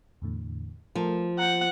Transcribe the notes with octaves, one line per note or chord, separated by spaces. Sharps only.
E2 A2 D3
F3 A3 A#4
F#5 A#5 G6